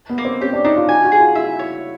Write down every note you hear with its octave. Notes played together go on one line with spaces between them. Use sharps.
B3
A#3
C4
C#4 G4
D4
D4 D#4
F4
F#4 G#5
F#4
G#4
F4
E4 E5
C#5